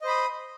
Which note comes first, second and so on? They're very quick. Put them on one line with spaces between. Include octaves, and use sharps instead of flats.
D#5 C5 B5 D#6